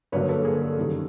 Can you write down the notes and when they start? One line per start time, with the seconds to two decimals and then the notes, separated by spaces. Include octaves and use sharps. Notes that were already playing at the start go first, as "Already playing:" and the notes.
0.12 G2 D3 F#3 A#3 B4 C#5
0.29 A4 B4
0.45 G#4 A#4
0.61 A4
0.78 F#2 D#3 G3